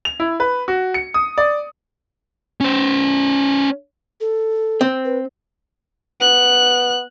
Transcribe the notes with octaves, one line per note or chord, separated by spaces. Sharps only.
F7
E4
B4
F#4
C#7
D#6
D5
C#4 C5
A4
C4
B4
B3 F#6